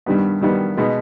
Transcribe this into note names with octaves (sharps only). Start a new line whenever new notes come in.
G2 D#3 G3 B3
G2 D#3 G3 B3
B2 G#3 B3 D#4